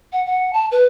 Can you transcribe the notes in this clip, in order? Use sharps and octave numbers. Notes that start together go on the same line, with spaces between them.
F#5
F#5
A5
B4